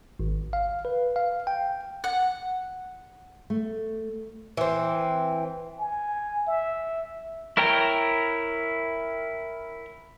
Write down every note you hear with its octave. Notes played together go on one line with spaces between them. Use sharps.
G#1
F5
B4
F5
G5
F#5
A3
E3 C4
G#5
E5
E4 A#4 C#5 G5 A#5